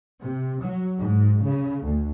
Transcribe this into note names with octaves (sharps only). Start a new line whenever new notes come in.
C3
F#3
G#2
C#3
D2